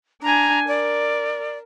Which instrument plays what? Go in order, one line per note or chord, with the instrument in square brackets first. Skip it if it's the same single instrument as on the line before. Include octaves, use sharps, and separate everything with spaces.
[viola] D4 G#5 [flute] A#5
[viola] A#4 [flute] D5